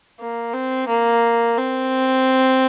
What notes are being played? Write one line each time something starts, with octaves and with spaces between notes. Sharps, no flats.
A#3
C4
A#3
C4